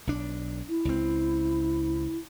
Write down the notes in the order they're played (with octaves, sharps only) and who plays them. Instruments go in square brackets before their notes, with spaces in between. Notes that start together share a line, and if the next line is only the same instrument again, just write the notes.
[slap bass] B1 D4
[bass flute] E4
[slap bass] C#2 C4